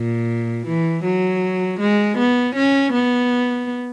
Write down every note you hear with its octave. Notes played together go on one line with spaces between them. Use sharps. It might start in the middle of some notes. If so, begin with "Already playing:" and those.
Already playing: A#2
E3
F#3
G#3
B3
C#4
B3